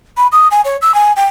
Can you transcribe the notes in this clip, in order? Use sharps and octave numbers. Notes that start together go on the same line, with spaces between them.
B5
D#6
G#5
C#5
E6
G#5
G5